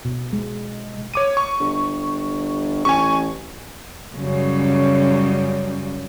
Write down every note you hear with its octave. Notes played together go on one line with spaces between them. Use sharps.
B2
G#3
C#5 D6 D#7
C#6
G1
A1 G#5 C#6
F#2 C#3 G3